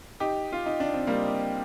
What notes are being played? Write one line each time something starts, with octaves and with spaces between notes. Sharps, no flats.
D#4 G4
F4
D#4
D4
C4
G3 A#3